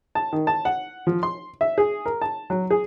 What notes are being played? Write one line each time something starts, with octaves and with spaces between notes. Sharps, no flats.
A5
D#3
A5
F#5
F3
C6
E5
G#4
A#4
A5
F#3
G#4